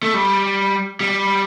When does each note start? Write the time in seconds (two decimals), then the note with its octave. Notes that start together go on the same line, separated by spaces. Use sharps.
0.03 A3
0.14 G3
1.01 G3